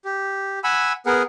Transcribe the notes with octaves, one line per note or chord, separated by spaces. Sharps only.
G4
F#5 G#5 B5 E6
B3 G#4 A#4 F#5